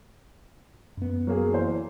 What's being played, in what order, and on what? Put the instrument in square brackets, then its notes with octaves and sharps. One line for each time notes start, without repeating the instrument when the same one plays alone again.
[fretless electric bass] F#2 B3
[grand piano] F#3 A#3 G#4
E3 C5